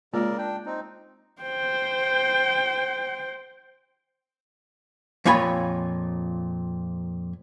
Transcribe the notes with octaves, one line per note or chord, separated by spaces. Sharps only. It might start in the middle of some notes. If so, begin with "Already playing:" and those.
C#3 G#3 A#3 F4 A#4 D5
D4 G5
C4 D#4
C5 G5
F2 A#2 C#5 G#5 B5